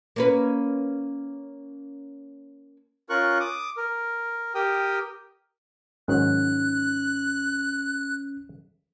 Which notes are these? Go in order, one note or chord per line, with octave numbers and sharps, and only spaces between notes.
A#3 C#4 B4
C#4 F4 A#4 C#6 F#6
D6 D#6
A#4
G4 A#4 G5 D#6
G#2 D#3 F#3 C#4 F#6